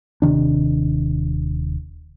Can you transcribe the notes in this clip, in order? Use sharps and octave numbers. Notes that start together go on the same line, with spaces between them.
D#1 C3 D#3 D4